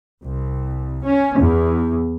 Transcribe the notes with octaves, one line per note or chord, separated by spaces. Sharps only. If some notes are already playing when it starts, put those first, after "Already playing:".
C2
C#4
E2